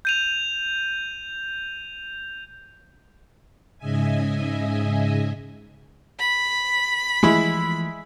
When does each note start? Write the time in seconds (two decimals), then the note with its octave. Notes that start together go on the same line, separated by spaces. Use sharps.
0.05 G6 D#7 F7
3.78 G#2 C#3 D#5 E5 G#5
6.20 B5
7.23 E3 F3 G#3 A3 E4